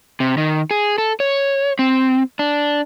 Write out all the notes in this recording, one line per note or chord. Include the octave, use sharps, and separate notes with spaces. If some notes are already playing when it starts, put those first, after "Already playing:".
C3
D#3
G#4
A4
C#5
C4
D4